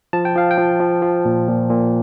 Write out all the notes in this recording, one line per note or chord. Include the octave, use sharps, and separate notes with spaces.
F3 A5
G5
F3 F5
G5
F3
F3
F3
A#2
A#2
A#2